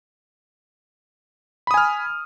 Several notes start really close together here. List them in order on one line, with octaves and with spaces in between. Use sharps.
B5 D#6 G#5 F6